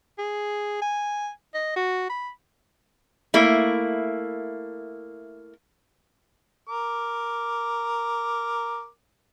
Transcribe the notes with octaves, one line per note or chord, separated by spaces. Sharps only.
G#4
G#5
D#5
F#4
B5
A3 A#3 E4
A#4 D6